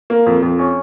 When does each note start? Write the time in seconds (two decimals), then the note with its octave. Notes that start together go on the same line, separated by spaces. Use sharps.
0.10 A#3
0.26 F2
0.43 F2
0.59 C#4